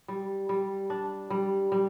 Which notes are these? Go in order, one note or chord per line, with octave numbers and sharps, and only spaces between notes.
G3
G3
D4
G3
G3